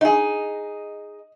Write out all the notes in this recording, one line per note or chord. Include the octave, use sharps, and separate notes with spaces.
D#4 G#4 D#5